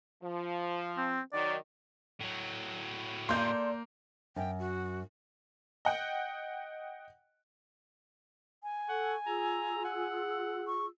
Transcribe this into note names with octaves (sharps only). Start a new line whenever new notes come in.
F3
C4
D#3 F#3 D5
A2 F#3
A#3 A4 D5 C6 G6
F#2 G5
F#4
D#5 F#5 G5
G#5
A4 F#5 C#6
F4 G#4 A#5 E6
F#5
C#6